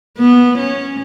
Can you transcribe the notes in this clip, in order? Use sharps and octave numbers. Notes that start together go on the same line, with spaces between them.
B3
C#4